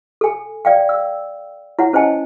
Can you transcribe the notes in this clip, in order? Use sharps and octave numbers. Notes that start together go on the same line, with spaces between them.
A4 G#5
D5 F5 G5
E6
E4 C#5 F#5
C#4 C5 D#5 G#5 A5